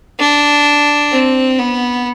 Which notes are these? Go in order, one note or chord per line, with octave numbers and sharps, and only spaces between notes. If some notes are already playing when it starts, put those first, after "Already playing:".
D4
C4
B3